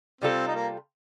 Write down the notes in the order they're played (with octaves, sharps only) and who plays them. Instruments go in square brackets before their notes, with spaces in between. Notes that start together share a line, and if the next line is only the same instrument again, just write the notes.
[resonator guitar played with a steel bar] C3 G3 D4 F4 A4 [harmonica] C4
[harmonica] D#4
A#3